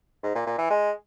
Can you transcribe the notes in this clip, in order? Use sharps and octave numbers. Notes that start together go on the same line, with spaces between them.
G#2
A#2
A#2
E3
G#3